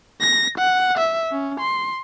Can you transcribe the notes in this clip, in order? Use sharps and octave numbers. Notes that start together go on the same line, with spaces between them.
A#6
F#5
E5
C#4
C6